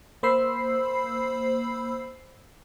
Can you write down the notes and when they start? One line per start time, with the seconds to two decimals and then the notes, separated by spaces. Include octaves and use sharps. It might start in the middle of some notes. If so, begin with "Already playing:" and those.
0.23 A#3 C5 B5 E6 C7